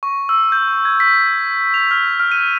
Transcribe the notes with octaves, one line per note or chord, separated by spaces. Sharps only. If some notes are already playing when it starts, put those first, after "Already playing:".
C#6
E6
G6
G#6
B6
F7
F6
F6
D#7